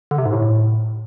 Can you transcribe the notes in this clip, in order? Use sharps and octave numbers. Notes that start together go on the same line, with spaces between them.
D3
C3
G#2
A2